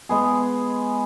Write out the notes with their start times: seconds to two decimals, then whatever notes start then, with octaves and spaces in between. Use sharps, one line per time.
0.09 G#3 B3 G#4